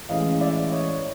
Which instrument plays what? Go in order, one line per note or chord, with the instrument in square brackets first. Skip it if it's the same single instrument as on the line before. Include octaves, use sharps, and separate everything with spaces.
[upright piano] A2 E3 G#3 C#4 D#5 F5
D5 E5
C#5 D#5